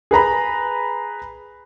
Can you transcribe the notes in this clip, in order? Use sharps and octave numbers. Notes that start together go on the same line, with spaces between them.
G#4 B4 A#5 B5